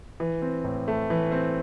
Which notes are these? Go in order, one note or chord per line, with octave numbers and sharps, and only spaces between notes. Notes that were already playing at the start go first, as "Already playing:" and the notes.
E3
C4
A2
A3
E3
C4